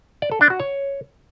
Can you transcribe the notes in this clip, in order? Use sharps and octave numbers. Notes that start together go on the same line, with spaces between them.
D5
A4
D4
F#4
C#5